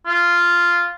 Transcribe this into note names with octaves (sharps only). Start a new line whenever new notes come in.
F4